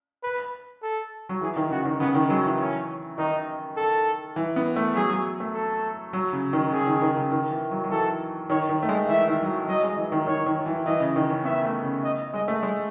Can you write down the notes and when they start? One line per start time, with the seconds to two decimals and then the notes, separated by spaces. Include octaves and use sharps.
0.23 B4
0.82 A4
1.29 F#3
1.41 E3 G#4
1.56 D#3
1.70 C#3 F#4
1.85 D#3
2.00 C#3 B3
2.15 D#3
2.30 F#3 G#3
2.44 E3
2.60 C#4
3.18 D#3 D#4
3.77 A4
4.36 E3
4.56 B3
4.76 A3
4.95 F#3 G#4
5.10 F#3
5.40 A3
5.54 A4
6.13 F#3
6.33 C#3
6.53 D#3
6.72 C#3 G#4
6.87 D#3
7.02 D#3
7.17 C#3
7.32 D#3
7.51 E3
7.71 F#3
7.84 F#3
7.90 E3 A4
8.50 D#3 C#5
8.69 D#3
8.83 A3
8.89 G#3
9.08 E3 E5
9.28 D#3
9.42 F#3
9.49 E3
9.67 F#3 D#5
9.83 G#3
9.97 E3
10.12 D#3
10.27 D#3 C#5
10.46 D#3
10.66 E3
10.86 E3 D#5
11.00 C#3
11.16 D#3
11.30 C#4
11.45 B3 E5
11.65 A3
11.84 C#3
12.04 D#5
12.34 G#3 D#5
12.48 A3
12.63 G#3